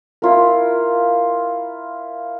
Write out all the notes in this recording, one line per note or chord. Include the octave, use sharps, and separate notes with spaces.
E4 F4 A#4